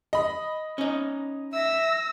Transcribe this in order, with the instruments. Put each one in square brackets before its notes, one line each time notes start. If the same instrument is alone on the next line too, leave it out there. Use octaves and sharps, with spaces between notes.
[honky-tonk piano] D#5 B5
[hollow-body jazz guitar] C#4 D#4
[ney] E5 [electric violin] E6 A#6